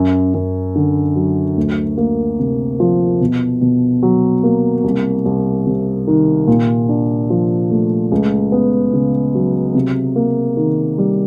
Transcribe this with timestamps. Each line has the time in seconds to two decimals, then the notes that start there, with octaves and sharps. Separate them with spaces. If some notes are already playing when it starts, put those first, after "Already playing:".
Already playing: F#2
0.34 F#2
0.75 D3
1.16 F#3
1.57 D2
1.98 A#3
2.39 C3
2.80 F3
3.21 B2
3.61 B2
4.03 F#3
4.44 A#3
4.84 C2
5.25 C2
5.67 C3
6.07 D#3
6.47 A#2
6.89 D4
7.30 F3
7.71 A3
8.12 C#2
8.52 B3
8.93 C#3
9.35 F#3
9.75 C3
10.16 A#3
10.57 D#3
10.98 G3